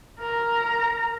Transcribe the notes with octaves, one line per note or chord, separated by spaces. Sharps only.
A#4 A#5